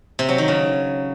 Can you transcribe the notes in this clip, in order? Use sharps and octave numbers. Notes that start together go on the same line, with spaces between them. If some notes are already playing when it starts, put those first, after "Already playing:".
C3
F#3
D#3
C#3